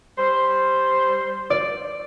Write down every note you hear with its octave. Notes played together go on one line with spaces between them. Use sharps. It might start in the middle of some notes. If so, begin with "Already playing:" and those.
G3 C5
D5